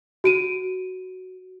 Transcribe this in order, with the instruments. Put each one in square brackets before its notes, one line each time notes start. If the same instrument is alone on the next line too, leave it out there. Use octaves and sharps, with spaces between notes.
[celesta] F#4 D7 D#7